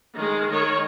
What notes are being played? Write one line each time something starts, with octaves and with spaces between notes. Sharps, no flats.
D#3 G#3
D#3 C#5